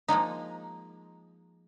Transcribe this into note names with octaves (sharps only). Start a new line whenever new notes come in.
F3 G#3 A#3 D#4